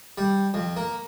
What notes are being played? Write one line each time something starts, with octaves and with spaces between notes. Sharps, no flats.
G3
F2
A#3